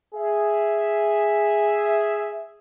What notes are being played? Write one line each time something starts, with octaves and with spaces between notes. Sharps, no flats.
G#4 E5